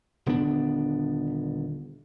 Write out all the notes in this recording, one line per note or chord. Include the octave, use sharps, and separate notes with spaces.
D#1 D3 B3 D4